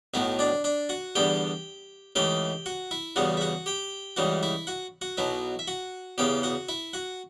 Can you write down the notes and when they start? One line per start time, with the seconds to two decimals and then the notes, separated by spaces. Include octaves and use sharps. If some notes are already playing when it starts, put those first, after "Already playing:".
0.14 B1 A2 F#3 B3 E4 E5
0.39 D4 D5
0.64 D4 D5
0.89 F#4 F#5
1.16 E2 D3 G3 B3 G4 G5
2.16 C#2 C#3 E3 A3 G4 G5
2.66 F#4 F#5
2.91 E4 E5
3.16 E2 C#3 G3 B3 F#4 F#5
3.37 E5
3.41 F#4 F#5
3.66 G4 G5
4.16 C#2 C#3 E3 G3 F#4 F#5
4.43 E4 E5
4.67 F#4 F#5
5.01 F#4 F#5
5.17 B1 B2 F#3 E4 E5
5.59 E5
5.68 F#4 F#5
6.18 E2 C#3 E3 B3 G4 G5
6.43 F#4 F#5
6.69 E4 E5
6.93 F#4 F#5